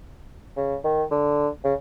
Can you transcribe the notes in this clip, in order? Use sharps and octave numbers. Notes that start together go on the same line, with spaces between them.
C#3
D#3
D3
C#3